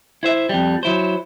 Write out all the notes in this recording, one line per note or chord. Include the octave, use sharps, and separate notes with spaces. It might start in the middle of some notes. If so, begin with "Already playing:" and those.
E4 C5 E5
F2 G3
F#3 E4 C5